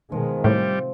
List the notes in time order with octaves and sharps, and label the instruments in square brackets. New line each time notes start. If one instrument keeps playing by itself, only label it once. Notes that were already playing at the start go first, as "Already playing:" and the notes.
[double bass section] B2 D#3 G#3 [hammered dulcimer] F3
[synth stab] A2 [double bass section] C3 [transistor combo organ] G3